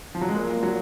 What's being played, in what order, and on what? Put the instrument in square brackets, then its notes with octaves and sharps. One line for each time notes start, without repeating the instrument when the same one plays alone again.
[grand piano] F3
F#3
G#3
[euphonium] A#2 [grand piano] A#3
[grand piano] F#3